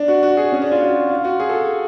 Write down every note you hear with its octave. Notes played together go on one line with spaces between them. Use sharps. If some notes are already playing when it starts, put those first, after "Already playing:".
Already playing: D4
F#4
F#4
G#4
C#4
D4
F4
F#4
F4
F#4
G#4
A4